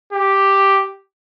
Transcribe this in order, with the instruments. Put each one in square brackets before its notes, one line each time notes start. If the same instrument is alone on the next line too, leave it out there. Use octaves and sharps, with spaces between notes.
[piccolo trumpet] G4